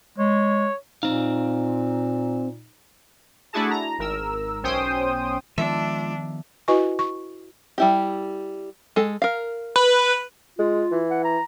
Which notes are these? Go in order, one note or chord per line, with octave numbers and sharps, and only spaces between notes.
G#3 C#5
A#2 C4 D#4 F5
A3 D4 E4 F#4 G#4 A5
A#5
G#1 A#4 E6
B1 C#4 C5 G5 D#6
D#3 F3 G#3 B3 D4 F4 E5 A5
E4 F#4 B4 D#5 G#5 C#6
C#6
G3 E4 G4
G#3 A4
A#4 F5
B4
G#3 F4
E3
F#5
A#5